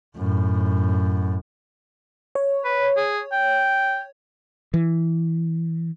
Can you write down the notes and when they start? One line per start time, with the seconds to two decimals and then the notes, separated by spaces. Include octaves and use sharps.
0.17 F#2 A2
2.35 C#5
2.65 B4
2.97 G#4
3.32 G5
4.74 E3